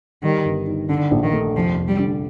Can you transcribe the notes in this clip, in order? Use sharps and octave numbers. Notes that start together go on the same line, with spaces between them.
D#3 G3
G1
D#3
D3 D4
A#1
D#3
A3
F1 F3
F1
G3
D3